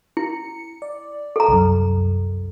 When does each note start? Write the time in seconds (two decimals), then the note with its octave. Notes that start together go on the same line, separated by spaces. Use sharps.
0.17 E4 C#7
0.82 D5
1.36 A4 A#5
1.48 C2 F#2